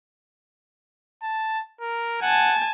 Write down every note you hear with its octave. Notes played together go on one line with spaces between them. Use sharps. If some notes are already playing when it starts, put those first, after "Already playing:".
A5
A#4
F#5 G#5 A5